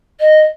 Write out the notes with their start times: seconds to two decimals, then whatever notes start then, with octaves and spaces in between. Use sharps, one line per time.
0.20 D#5